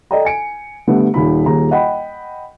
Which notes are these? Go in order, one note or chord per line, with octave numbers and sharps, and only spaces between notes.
A4 D5 D#5 G5 A#5
G#5 C#7 D7
D3 G3 A3 B3
D#1 D#3 B5
D#1 D#2 G#4 A#5
D#5 F#5 G5 B5